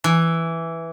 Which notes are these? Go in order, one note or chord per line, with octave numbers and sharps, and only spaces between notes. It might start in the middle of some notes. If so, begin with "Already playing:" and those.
E3